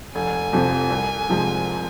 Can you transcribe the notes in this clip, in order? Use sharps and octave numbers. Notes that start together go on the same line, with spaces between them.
F1 G#5
F2 C3 F3 C4
C2
C3 F3 G#3 C4